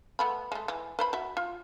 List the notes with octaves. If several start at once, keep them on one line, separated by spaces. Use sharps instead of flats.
A3 B3 B5
G#3 A3
E3
B4 C5 B5
F#4 E5
F4